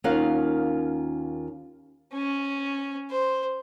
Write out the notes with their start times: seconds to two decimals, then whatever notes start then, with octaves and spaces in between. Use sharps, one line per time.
0.04 D#2 C#4 F4 A#4 F5 F#5
2.14 C#4
3.10 C5